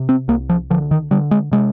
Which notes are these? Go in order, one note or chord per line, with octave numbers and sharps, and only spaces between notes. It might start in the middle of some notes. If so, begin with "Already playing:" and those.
Already playing: C3
C4
C2 A#3
F3
D3 F3
D#3
D3 G3
G#3
C3 G#3